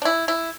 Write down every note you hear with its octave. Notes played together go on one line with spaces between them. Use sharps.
D4
E4
E4